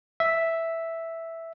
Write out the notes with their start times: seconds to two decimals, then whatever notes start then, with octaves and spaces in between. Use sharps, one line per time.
0.20 E5